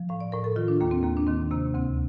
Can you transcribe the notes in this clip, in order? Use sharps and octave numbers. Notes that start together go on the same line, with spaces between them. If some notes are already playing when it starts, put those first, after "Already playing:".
Already playing: F3
A2 F5
D5
A2 A#4
A4
D#3 F4
D4
D#2 A#3
C4
D#2 A#3
D4
D#3 C4
C3 A#3
D2 C4